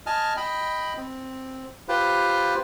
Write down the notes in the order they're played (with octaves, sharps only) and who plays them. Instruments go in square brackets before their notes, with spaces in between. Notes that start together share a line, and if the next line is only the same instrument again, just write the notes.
[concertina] D#5 G#5 A5 F6
D#5 G5 B5
C4
F4 G4 B4 C5